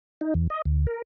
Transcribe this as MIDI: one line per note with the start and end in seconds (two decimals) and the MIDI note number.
0.21 0.34 63
0.34 0.47 40
0.50 0.62 75
0.65 0.86 38
0.87 1.02 70